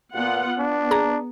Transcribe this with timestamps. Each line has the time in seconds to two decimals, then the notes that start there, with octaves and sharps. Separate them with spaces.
0.16 A#2 B3 F4 F#5
0.59 B3 D4
0.91 G#4 A#5